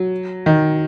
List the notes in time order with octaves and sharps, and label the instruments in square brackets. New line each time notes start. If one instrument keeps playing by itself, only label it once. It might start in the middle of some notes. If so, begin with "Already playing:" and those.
Already playing: [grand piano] F#3
D#3